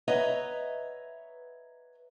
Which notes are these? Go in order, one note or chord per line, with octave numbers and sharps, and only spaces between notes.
B4 C#5 D#5 E5 F#5 A#5